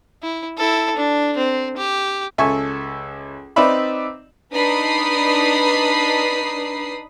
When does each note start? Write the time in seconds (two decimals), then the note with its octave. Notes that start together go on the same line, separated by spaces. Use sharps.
0.23 E4
0.58 E4 A4
0.97 D4
1.37 C4
1.77 G4
2.38 C#2 A4 E5 G#5 C#6
3.56 C4 D#4 B4 D5 E5 B5
4.52 D4 D#4 B4 B5 D#6 C7